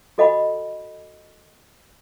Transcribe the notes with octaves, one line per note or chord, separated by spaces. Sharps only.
F#4 A4 D#5 F#5 G#5 B5